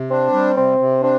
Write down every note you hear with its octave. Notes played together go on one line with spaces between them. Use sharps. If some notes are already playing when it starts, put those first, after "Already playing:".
Already playing: C3
C4 D4
G3
C3 C4
C3
C4 D4